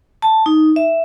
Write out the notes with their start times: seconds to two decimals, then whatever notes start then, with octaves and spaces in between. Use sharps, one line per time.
0.22 A5
0.46 D#4
0.76 E5